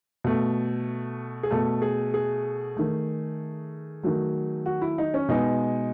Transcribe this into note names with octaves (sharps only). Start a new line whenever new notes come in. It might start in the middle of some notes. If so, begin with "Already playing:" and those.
B2 A3
G#4
B2 A3 A4
G#4
G#4
D#3 A3
D#3 F#3 A3
F#4
E4
D#4
C#4
B2 G#3 B3 D#4